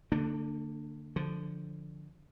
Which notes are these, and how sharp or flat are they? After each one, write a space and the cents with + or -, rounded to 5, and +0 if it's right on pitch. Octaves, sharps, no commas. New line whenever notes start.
D3 +0 A#3 -45 D4 +20
D3 +0 F3 +0